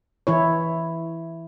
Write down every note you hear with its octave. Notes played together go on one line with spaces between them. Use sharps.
E3 E4 C#5